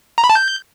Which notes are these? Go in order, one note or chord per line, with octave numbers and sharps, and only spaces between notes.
A#5
B5
A5
G6